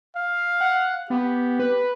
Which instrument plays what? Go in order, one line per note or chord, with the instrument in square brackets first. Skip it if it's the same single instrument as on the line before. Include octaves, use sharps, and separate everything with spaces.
[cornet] F5
[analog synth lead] F#5
[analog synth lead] B3 [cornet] G4
[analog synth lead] B4